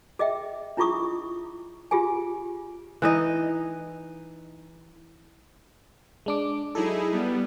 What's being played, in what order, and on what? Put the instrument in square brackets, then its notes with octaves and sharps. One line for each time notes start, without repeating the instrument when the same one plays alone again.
[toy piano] G#4 D#5 E5 G5
D4 E4 F4 G#4 C#6 D#6
F4 G4 G#4 G#5
[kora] E3 D#4 D#5
[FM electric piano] G#3 D4 D6
[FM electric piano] F#3 A4 [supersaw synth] D#4 E4 G#4
[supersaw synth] G3 B3